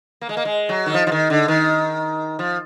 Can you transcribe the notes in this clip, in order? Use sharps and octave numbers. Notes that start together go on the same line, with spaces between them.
A#3
G#3
A#3
G#3
F#3
D#3
F3
F3
D#3
D3
D#3
F3